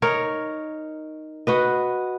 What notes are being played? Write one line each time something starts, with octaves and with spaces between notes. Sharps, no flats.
D#4 A#4 C#5
F#4 B4 D#5